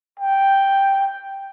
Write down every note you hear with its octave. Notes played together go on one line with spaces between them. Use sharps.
G5